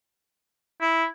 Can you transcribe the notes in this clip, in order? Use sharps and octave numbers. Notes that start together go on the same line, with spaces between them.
E4